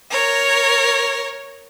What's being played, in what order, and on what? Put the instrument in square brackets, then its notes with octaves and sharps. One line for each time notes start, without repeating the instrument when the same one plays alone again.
[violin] A#4 C#5